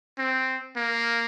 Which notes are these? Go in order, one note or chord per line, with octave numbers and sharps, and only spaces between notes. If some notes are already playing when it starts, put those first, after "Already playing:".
C4
A#3